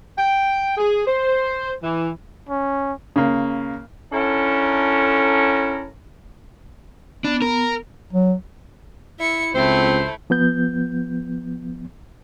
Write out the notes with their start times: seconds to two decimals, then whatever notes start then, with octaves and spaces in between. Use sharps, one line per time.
0.17 G5
0.77 G#4
1.06 C5
1.82 E3
2.49 C#4
3.16 C#3 A#3
4.13 D3 C#4 E4 A4 A#4 A#5
7.24 B3 D4
7.42 A#4
8.13 F#3
9.20 E4 E5 C#7
9.55 C#2 A3 C4 E4 C5
10.30 F3 B3 G6